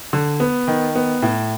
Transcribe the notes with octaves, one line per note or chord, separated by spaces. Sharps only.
D3
B3
D#3
B3
A2